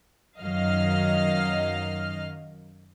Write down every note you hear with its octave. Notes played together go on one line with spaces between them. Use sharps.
F#2 D#3 F#3 D#5 F5 F6